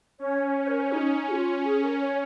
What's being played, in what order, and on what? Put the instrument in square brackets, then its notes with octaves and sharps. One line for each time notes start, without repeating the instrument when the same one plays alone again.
[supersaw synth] C#4 [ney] C#5
[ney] C#5
A#4
C#5
[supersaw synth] C#4 [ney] D#4
[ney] G#4
F4
G#4
A#4
C#5